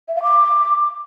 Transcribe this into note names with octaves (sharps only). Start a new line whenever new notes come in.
E5
F5
D6